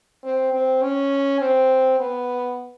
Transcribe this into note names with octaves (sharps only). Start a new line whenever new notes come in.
C4
C4
C#4
C4
B3